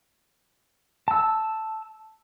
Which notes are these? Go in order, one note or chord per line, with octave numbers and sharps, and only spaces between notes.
A5 E6